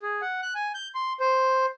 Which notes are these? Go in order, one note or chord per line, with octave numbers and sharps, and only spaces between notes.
G#4
F#5
F#6
G#5
G6
C6
C5